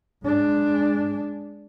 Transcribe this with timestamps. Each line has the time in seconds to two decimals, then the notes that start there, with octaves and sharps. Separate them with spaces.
0.24 G#3 D4